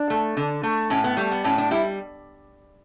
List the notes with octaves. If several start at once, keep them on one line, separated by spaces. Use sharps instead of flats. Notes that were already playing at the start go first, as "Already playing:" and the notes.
Already playing: D4
A3
D3
A3
A2 C#4
B3
G3 A3
B3
A2 C#4
D4
G3 E4